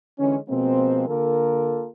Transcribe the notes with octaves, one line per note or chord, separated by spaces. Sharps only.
D3 E3 G#3 C#4
B2 F3 G#3 A#3 C4
D3 A#3 F4 A4 A#4